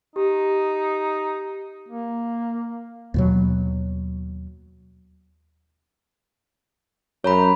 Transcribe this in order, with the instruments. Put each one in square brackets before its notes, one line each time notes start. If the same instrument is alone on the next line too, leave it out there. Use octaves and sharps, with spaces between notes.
[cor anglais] D#4 [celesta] G4
[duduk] A#3
[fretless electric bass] D#2 B2 F#3
[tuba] F#2 [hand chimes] C#5 A#5 B5